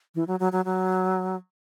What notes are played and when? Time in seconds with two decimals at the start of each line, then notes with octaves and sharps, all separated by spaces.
0.15 E3
0.28 F#3
0.40 F#3
0.52 F#3
0.65 F#3